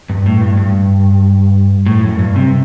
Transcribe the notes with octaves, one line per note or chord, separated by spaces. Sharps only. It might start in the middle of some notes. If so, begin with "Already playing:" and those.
G2
A2
G2
G2
A2
F#2
G2
C3